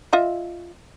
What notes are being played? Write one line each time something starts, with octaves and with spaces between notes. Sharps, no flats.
F4 D#5 E5